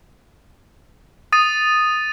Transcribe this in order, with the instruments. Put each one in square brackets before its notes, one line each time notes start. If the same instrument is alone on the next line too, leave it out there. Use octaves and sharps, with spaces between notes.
[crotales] D#6 A6 D#7